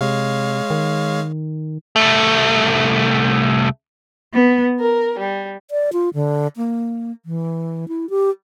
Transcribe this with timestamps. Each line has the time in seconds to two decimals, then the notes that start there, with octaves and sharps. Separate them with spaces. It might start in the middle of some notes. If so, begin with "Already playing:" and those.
0.01 C3 G#3 C#5 F5
0.70 D#3
1.96 C2 A3
4.33 B3
4.78 A#4
5.18 G3
5.71 D5
5.93 F4
6.14 D3
6.57 A#3
7.26 E3
7.88 E4
8.10 G4